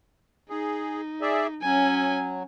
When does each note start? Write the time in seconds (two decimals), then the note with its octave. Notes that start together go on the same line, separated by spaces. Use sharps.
0.50 D#4 G#4
1.21 G#4 D5 E5
1.62 F#3 C#4 G#5